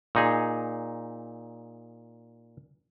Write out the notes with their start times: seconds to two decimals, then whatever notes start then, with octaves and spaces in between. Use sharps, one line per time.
0.15 A#2 D#4 G#4